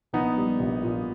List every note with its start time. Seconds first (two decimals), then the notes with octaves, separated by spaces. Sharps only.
0.13 A#1 B3 D#4
0.37 G3
0.60 A#1
0.83 A#2